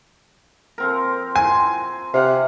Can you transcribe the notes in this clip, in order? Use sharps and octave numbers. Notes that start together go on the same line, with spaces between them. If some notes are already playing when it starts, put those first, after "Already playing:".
F3 C4 A#4
G#5 C6
C3 F5 F#5